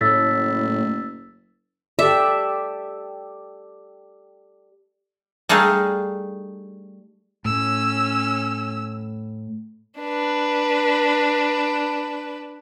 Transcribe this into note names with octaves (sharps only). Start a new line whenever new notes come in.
F#1 A2 E6 A6 B6
G4 A4 D5 E5
G3 A3 D4 D#4 G#4 F5
A2 C#4 E6
D4 B4